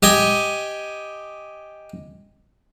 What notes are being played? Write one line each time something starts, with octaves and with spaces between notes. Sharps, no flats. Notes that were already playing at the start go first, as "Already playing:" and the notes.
G4 D#5 G#5